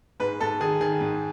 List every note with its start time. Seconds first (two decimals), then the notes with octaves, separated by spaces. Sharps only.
0.20 G#2 B4
0.41 G#2 A4
0.60 D#3 G#4
0.81 D#3 G#4
1.01 G#2